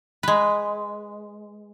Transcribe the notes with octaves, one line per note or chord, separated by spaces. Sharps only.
G#3 B4